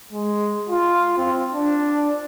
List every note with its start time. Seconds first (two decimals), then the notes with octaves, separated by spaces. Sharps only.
0.13 G#3
0.70 F4
1.18 C4
1.53 D4